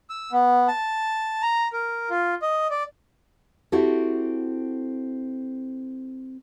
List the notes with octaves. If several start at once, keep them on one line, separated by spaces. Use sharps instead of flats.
E6
B3
A5
A#5
A#4
F4
D#5
D5
C4 E4 F#4 G4 A4